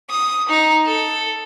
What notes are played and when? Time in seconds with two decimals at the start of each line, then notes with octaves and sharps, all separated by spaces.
0.10 D#6
0.49 D#4
0.86 A4